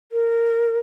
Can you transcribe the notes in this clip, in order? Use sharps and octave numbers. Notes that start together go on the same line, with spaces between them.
A#4